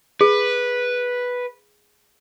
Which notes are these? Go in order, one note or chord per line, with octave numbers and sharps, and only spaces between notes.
G#4 B4